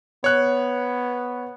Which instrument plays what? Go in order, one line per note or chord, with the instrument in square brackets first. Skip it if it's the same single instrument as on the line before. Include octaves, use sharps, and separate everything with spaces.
[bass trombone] B3 [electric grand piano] C#5 F#6